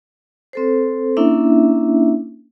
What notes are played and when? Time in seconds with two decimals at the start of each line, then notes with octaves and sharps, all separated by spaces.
0.53 C4 A4 C5
1.17 A#3 C#4 D4 E4 E5